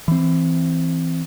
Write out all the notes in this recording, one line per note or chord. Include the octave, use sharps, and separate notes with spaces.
E3 C4